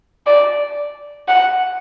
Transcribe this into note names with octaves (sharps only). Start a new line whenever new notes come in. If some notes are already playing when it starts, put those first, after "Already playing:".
D5
F#5